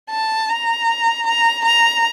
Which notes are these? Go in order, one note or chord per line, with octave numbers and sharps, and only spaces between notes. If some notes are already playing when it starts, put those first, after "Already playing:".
A5
A#5
A#5
A#5